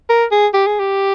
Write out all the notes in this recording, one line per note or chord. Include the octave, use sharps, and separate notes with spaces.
A#4
G#4
G4
G#4
G4